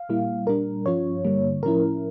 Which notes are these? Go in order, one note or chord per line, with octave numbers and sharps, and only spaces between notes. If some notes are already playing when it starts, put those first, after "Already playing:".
Already playing: F5
A#2 G3 A#3 E4
A#2 G3 D4 A#4
G2 F3 C#4 F4 C#5
G2 D3 G3 A#3
A2 F3 C#4 E4 A#4